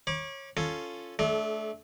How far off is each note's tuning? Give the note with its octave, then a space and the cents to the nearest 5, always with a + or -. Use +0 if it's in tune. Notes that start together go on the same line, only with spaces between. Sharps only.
C#5 -20 B5 -40 D6 +0
C#4 +0 F4 +0 A4 +0
A3 -20 D4 -10 A4 -45